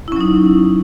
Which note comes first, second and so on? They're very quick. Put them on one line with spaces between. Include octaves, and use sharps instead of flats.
E4 C#4 F#3 D#4